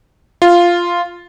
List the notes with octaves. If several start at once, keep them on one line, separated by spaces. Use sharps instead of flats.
F4